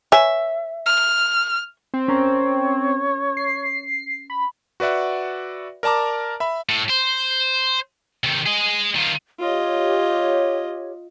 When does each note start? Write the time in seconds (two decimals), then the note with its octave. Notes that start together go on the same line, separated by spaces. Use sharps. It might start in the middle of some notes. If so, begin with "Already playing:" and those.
0.12 B4 C#5 E5 G#5
0.86 F6
1.94 C4
2.08 C#4 A#4 C#5 A#5
3.37 C7
4.30 B5
4.80 F#4 B4 D5 E5 F#5
5.83 A#4 D5 A5 A#5 D6
6.40 E5 B5
6.69 A2
6.90 C5
8.24 C3 D#3
8.46 G#4 D#5
8.96 D#3 F4
9.40 F4 G4 C#5 D#5